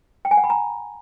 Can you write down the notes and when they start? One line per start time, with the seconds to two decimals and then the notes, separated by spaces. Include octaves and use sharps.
0.25 G5
0.31 G#5
0.37 F#5
0.44 B5
0.50 A#5